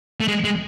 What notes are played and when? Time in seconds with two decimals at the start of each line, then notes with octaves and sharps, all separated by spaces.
0.20 A3
0.28 G#3
0.44 G#3